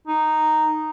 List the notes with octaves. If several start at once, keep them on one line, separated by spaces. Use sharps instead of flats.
D#4